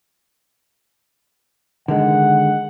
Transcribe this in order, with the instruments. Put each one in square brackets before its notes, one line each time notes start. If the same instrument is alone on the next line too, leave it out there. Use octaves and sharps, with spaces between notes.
[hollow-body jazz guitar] D3 D#3 G#3 [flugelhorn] F#5